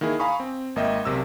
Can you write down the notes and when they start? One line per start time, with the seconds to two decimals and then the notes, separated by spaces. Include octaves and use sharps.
0.01 D#3 A#3 E4 G#4
0.19 F5 G#5 A#5 B5 C#6 D#6
0.40 C4
0.76 G#1 A#3 D#5 E5 G5
1.05 B1 C3 A#4 E6